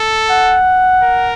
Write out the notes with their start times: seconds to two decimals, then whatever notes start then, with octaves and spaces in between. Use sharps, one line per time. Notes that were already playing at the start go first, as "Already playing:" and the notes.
Already playing: A4
0.30 F#5
1.04 A#4